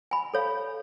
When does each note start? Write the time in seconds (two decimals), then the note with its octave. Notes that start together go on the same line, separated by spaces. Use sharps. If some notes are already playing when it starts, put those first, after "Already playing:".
0.11 G#5 B5
0.34 A4 C#5 F5